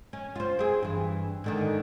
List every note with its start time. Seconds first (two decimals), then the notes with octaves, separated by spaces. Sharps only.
0.13 C#4
0.35 F4 C5
0.59 C4 G#4
0.83 G2 E3
1.44 G#2 D3 D#3